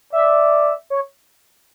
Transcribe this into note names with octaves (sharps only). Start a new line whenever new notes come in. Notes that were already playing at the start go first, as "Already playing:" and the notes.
D5 E5
C#5